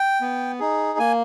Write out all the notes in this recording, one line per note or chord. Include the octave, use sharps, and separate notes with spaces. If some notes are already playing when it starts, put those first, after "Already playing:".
Already playing: G5
B3
D#4 G#4
A#3 G#5